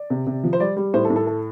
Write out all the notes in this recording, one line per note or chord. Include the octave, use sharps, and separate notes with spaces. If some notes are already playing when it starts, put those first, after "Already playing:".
Already playing: D5
C3
C3
F3
C5
G3 D5
G3
A2 C5
A4
A2
A4
A4